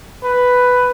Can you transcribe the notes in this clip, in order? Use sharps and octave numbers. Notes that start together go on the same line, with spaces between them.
B4